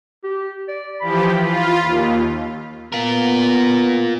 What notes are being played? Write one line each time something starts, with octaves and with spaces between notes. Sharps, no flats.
G4
D5
E3 F3 G4 B5
F4
D#2
B3 F4 A#4